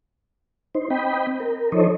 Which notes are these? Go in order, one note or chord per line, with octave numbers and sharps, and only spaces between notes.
D#4 C5
C4 D#5 G5 B5
A#4
F3 D#4 A4 C5 C#5 D#5